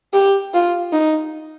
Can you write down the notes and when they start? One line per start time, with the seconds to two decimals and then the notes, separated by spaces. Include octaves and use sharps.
0.14 G4
0.54 F4
0.92 D#4